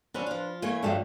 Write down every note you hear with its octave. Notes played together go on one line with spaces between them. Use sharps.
D3 F3 C#4 D4 B4
F3 F4
E3 A3 A#3 C#5 G#5
G2 D3 F3 F#3 A3